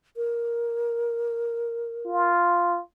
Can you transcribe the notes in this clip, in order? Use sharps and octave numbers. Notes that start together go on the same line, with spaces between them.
A#4
F4